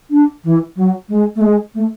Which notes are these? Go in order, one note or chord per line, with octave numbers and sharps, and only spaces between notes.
D4
E3
F#3
G#3
A3
G#3
A3